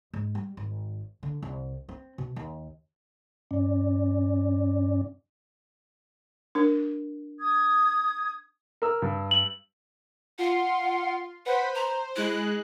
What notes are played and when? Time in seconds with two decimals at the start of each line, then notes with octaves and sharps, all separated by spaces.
0.13 G#2
0.35 G3
0.57 G#1
1.23 D3
1.42 C2
1.89 C4
2.18 B2
2.36 D#2
3.51 G2 C#4 D5
6.55 D4 A#4
7.39 D#6 G#6
8.82 A#4 E6
9.02 G2
9.31 F#7
10.39 F4 F#5 C6
11.46 B4 C5 F#5 B5
11.75 C5 A#5
12.16 G#3 E4 F#6